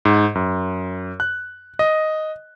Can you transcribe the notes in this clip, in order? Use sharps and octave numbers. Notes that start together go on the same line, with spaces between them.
G#2
F#2
F#6
D#5